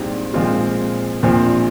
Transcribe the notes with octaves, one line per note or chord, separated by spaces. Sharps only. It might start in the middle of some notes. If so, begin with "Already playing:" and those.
Already playing: A#1 G#2 G3 C4
A#2 F3 G#3 C4 F4
A#1 A#2 F3 C4